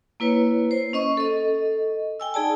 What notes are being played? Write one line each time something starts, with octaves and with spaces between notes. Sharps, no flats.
A#3 E4 B4 C#5
C5
C#4 D#5 C#6
A4 D#5
G5 G#5 E6
D#4 G#4 D5 A5